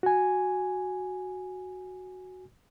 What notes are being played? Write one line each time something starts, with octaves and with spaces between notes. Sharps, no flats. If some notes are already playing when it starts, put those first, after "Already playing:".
F#4 G#5